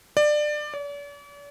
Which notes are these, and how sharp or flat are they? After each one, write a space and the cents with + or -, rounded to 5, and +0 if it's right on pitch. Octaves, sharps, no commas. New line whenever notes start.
D5 +20
D5 -45